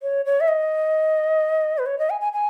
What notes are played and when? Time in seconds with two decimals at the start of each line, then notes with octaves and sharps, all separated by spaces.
0.02 C#5
0.25 C#5
0.40 E5
0.48 D#5
1.78 B4
1.86 C#5
1.99 D#5
2.10 G#5
2.21 G#5
2.33 G#5